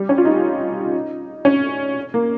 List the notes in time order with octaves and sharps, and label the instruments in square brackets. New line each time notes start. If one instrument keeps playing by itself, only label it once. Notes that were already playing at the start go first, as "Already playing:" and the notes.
Already playing: [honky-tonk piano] G3
C#4
F4
D#4
C#4
A#3